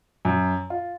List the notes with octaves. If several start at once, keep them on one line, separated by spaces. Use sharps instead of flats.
F#2
F4